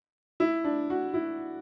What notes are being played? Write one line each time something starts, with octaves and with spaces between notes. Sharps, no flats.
E4
D4
F#4
E4